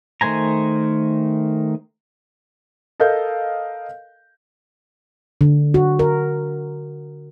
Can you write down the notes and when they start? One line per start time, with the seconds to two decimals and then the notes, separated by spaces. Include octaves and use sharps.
0.21 D#3 A3 C5 G#5 A#5
3.00 A4 A#4 D#5 F5 G6
5.41 D3
5.74 F#4
5.99 A#4